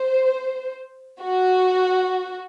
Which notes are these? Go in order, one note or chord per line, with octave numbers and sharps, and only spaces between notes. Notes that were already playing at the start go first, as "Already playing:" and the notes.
Already playing: C5
F#4